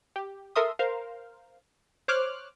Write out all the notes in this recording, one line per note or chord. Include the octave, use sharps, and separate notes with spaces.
G4
A4 A#4 E5 C6 D#6
A#4 C5 F5
C5 C#5 D6 F6 F#6